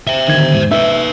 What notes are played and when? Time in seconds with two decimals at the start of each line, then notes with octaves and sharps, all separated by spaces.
0.07 C5 E5
0.28 D3 D#3 G#6
0.53 E2 G#2
0.71 D#4 B4 E5